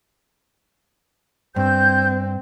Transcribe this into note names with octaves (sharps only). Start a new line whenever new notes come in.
G2 C4 G6